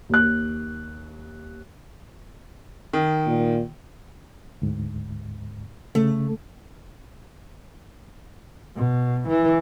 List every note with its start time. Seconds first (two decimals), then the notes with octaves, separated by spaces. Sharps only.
0.09 D#2 F#6
2.93 D#3
3.26 A#2
4.62 D2 G#2
5.95 C#3 A3
8.76 B2
9.29 E3